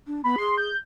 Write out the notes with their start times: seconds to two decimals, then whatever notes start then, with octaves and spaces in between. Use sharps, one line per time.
0.07 D4
0.24 B3 B5
0.38 G#4 C6
0.58 G6